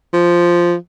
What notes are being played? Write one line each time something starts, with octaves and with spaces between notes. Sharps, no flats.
F3